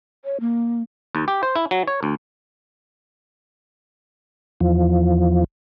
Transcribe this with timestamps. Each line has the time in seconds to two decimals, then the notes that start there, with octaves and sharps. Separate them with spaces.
0.25 C#5
0.40 A#3
1.15 D#2
1.28 G4
1.43 C5
1.56 E4
1.71 F#3
1.88 C#5
2.03 D2
4.61 E2 F3